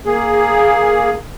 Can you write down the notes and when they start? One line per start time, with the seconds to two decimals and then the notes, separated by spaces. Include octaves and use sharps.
0.06 A#3 G#4